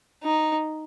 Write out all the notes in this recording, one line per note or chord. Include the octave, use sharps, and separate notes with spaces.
D#4